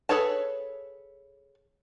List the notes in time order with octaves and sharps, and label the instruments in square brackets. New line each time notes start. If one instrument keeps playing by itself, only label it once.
[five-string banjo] G#4 A4 B4 C#5 A5